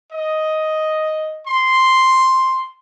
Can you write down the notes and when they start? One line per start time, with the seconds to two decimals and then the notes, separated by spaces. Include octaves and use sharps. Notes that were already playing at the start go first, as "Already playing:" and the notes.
0.11 D#5
1.45 C6